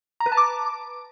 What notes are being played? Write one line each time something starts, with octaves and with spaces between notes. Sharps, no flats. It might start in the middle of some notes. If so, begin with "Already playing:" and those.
A#5
B4
A5
D6